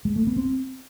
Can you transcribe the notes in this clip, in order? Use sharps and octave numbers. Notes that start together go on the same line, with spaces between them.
G#3
A3
B3
C4